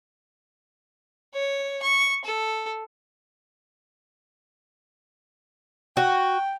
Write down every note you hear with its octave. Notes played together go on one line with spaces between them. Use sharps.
C#5
C#6
A4
F#4 G5